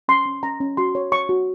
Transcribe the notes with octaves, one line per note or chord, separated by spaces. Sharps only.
C#4 C6
C#4
C#4 A#5
C#4
F#4 C6
C#5
C#5 C#6
F#4